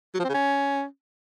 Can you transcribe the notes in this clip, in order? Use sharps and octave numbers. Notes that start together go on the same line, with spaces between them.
F#3
F3
C4
C#3
C#4